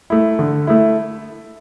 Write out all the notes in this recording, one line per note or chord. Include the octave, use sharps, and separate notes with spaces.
A3 E4
D3
A3 E4